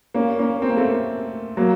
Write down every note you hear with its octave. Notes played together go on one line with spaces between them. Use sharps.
A#3 C#4
A#3 C#4
C4
A#3
A3 C4
F#3 A#3